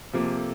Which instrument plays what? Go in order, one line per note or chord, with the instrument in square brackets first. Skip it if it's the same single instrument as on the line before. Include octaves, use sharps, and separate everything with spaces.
[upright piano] C3 F3 A#3 [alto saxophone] A4
[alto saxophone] G#4
A4